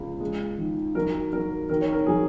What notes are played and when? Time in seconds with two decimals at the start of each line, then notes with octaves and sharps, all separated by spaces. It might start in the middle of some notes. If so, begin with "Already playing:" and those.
Already playing: C#2 C#3
0.21 G#3
0.58 D#3
0.95 F#3 A#4
1.32 F#3 A#4
1.69 D#3 A#4
1.81 C#5
1.92 A#4
2.07 F#3 G#4